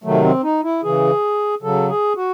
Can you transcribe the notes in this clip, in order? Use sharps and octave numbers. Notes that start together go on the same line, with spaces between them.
C3 D#3 F#3 A3
C4
D#4
E4
C#3 E3 G#4
C#3 F#3 A4
G#4
F#4